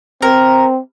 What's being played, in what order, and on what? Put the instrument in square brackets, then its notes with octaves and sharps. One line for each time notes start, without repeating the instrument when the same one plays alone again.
[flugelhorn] C4 [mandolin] A#4